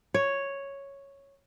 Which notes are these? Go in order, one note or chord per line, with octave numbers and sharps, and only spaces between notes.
C#5